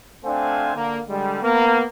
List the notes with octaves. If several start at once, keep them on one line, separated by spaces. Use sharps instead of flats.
A3 C4 D4 C5 F5 G#5
D3 A#3
D3 G3 G#3
A#3 B3